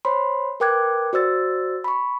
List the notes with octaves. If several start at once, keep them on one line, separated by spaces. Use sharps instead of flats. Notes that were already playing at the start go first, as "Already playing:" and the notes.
C5 C#5 B5 C6
A#4 B4 G5 D6 F#6 G#6
F#4 C5 D5 E6 A6
B5 C#6